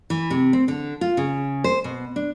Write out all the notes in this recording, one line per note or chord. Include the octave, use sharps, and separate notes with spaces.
E3
C3
C4
D3
F4
C#3
C5
B2
D4